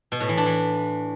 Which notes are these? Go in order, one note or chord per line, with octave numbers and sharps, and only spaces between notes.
B2
A2
E3
D4
E3